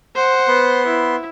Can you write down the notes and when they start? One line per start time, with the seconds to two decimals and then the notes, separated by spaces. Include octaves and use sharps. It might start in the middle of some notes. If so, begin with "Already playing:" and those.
0.15 C5 F#5
0.47 B3 B4 C6
0.86 E4